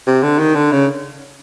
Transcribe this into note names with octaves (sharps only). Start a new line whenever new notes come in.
C3
D3
D#3
D3
C#3